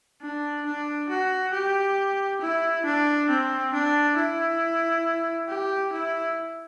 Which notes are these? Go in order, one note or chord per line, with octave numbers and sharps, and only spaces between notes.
D4
D4
F#4
G4
E4
D4
C4
D4
E4
G4
E4